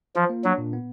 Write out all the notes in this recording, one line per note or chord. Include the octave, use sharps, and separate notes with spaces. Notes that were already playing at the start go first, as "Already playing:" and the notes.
F3 F4
A#3
F#3 D4
A#2
B3